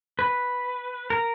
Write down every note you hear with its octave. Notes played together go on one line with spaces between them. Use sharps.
B4
A#4